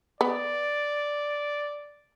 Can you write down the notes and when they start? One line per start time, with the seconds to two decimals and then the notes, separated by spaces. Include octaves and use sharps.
0.21 B3 D5